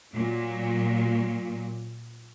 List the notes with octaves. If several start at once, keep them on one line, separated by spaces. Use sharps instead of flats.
A#2 F#3